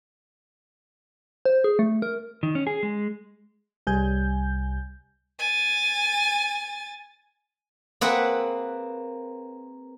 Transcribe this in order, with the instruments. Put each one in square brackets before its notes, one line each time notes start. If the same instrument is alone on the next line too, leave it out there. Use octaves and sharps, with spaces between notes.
[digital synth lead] C5
G#4
A3
A#4
[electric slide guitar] D#3
C#4
G#4
G#3
[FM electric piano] C2 G3 G#5 G6
[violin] G#5 A6
[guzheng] A#3 C4 G#4 B4 E5 F#5